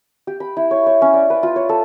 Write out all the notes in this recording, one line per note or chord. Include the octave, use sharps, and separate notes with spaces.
G4
B5
E4
C#5
C#5
C#4
D5
B4
F4
C#5
A4